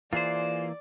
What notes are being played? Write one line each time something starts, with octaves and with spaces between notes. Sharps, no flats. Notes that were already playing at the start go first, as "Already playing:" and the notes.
E3 A#3 F4 G#4 C5 D5